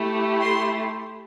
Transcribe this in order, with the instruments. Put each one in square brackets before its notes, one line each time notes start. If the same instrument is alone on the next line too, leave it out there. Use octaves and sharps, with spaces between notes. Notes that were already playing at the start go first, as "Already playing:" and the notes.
Already playing: [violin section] A3 E4 G4
C6